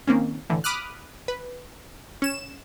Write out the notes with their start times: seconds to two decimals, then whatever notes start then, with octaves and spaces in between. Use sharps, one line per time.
0.07 D#3 A#3 C4 C#4
0.50 A2 D3 E3
0.64 B5 D6 D#6 F6 F#6
1.28 B4
2.22 C#4 E7